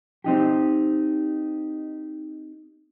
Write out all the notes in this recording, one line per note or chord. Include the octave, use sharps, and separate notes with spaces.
C4 D#4 G4